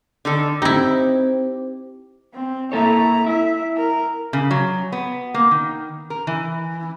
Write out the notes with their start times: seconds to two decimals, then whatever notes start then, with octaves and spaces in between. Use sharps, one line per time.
0.25 D3 D#3 A4
0.62 C4 D#4 E4 G4
2.34 C4
2.72 A#3 E4 A4 C#5 A#5
3.26 E4 E5
3.77 A#4
4.33 C#3
4.51 F#3
4.92 B3
5.34 A#3
5.51 D#3
6.10 A#4
6.27 E3